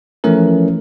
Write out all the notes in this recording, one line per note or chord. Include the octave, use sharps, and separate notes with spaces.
E3 F3 A3 C#4 A#4